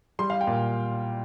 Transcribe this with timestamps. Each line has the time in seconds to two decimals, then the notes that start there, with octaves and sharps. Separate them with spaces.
0.19 G3 C6
0.30 F5
0.41 G5
0.47 A#2